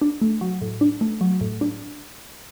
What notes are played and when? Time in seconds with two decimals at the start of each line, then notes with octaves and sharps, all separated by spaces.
0.01 D4
0.22 A3
0.41 F#3
0.61 A2
0.81 D4
1.01 A3
1.21 F#3
1.41 A2
1.61 D4